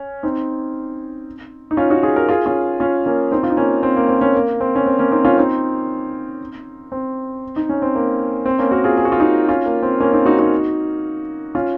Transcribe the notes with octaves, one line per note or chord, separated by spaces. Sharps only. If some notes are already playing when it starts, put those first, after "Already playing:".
Already playing: C#4
C4 D#4
D#4
C#4 F4
D#4 F#4
F4 G#4
F#4 A#4
F4 G#4
C#4 F4
C#4 F4
A#3 C#4
C4 D#4
F4
D#4
A#3 C#4
C4
A#3
C4
A#3 C#4
A#3
C4
C#4
C4
A#3 C#4
C4 D#4
C#4 F4
C4 D#4
C4
D#4
C#4
C4
A#3
C4
A#3 C#4
F#4 A#4
F4 G#4
G#4
F#4
F4
D#4 F#4
C#4 F4
A#3
C4
A#3 C#4
C4 D#4
D#4 F#4
D#4 F#4
C#4 F4